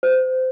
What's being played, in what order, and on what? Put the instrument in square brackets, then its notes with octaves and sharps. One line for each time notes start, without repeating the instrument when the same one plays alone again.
[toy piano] C5